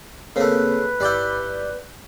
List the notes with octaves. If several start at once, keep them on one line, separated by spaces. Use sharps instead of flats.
C#3 A3 A#3 C4 B4
G1 G3 E4 D5 G6